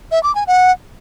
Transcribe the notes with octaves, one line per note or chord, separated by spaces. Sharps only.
E5
D6
G#5
F#5